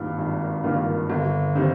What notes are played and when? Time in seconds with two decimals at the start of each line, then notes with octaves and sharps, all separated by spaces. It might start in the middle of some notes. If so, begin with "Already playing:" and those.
Already playing: G#1 G2 D#3 A#3 F4
0.19 G#1
0.64 G2 D#3 A#3 F4
1.10 G1
1.55 D#3 G3 C4